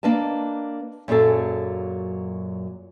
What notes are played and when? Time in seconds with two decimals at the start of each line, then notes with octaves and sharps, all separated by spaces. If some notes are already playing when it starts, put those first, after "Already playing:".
0.03 A#3 D4 B4 D#5 A5
1.08 F#2 A#2 F#3 G#4 A4